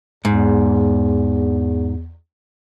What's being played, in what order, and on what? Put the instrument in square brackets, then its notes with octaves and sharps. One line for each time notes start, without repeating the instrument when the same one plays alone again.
[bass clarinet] E2 [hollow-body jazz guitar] G#2